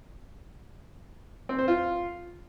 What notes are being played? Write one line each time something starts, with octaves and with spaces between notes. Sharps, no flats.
C4
C5
F4